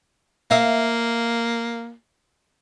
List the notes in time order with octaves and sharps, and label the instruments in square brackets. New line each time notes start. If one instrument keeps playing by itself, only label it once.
[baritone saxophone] A#3 [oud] E5 F5